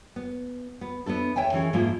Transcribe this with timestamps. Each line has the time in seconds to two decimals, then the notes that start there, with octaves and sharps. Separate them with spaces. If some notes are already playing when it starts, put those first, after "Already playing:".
0.16 B3
0.81 B3
1.06 B3 D4 E4 A4
1.36 D#2 C#5 E5 G5 G#5
1.52 D#3 E3 C#4 G#4
1.73 G#2 F3 G#3 A#3 E4 F4